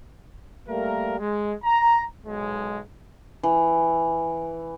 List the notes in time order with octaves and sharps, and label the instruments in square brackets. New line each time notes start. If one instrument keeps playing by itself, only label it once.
[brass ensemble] G3 A3 A#3 A#4
G#3
A#5
B1 G#3
[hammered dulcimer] E3